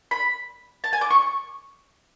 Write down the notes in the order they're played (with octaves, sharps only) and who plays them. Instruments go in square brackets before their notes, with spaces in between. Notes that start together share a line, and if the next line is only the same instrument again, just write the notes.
[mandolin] B5
A5
G#5
D6
C#6